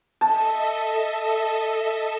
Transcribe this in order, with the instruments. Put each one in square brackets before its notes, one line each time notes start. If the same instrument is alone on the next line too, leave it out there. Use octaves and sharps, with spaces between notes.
[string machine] A4 D#5 E5 [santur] A5